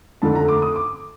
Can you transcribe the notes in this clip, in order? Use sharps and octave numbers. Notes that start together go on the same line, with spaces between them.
F2 D3 A3 A5
A#5
D6
D#6
D6